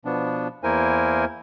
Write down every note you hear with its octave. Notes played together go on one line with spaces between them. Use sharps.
B2 F3 B3 D4
E2 A#3 E4 A#4 C5 G#5